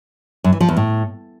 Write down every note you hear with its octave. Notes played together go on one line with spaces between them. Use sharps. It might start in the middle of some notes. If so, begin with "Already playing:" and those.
F#2
E3
F3
E2
A2